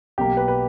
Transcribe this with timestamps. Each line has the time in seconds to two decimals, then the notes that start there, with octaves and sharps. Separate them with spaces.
0.18 B1 B2 F#3 A#3 G4
0.37 B4
0.48 B4